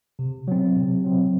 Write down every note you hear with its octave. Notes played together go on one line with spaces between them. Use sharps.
C3
F#3 C4
C3
F#3 C4